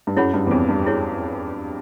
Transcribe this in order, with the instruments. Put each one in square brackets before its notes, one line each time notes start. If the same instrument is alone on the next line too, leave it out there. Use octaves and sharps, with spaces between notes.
[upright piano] G2
[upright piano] F#2 [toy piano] E4 G#4 C#5 F#5 B5
[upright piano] G2
E2
F2
G2
[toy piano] E4 G#4 C#5